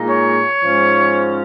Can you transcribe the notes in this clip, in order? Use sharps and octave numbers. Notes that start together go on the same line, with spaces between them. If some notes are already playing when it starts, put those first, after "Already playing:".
Already playing: A#2 G#3 D#4
C#5
G#2 F3 C#4